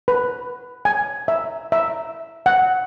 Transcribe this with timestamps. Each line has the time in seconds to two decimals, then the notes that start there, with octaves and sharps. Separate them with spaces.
0.08 B4
0.85 G#5
1.28 E5
1.72 E5
2.46 F#5